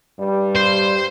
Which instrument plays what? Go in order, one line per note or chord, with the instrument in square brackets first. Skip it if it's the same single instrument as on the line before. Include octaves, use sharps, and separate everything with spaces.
[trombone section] G2 G3
[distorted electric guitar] C5